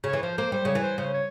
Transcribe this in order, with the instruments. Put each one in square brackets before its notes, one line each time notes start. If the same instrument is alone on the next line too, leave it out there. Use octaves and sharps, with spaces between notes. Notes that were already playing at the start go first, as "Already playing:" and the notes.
[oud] C#3 [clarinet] C#5
[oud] E3
[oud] F3 [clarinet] C5
[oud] A#3 [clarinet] C5
[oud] G3 [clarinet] C5
[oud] C#3 [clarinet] C#5
[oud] E3
[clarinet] C5
[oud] C#3 [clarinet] C5
[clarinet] C#5